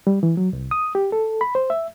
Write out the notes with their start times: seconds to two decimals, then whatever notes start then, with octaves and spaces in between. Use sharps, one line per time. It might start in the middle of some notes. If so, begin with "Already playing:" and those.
0.07 G3
0.23 E3
0.37 F#3
0.53 C2
0.71 D#6
0.95 G4
1.12 A4
1.41 B5
1.55 C5
1.70 E5